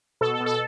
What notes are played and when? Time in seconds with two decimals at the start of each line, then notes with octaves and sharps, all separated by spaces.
0.21 B2 A4
0.34 A4
0.40 B2
0.46 A4